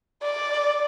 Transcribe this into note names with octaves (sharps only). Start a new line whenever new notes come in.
D5